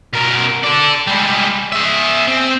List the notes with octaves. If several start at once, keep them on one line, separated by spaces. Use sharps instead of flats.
B2 A#4
A4 D5
G3 G#3
G#4 E5
C4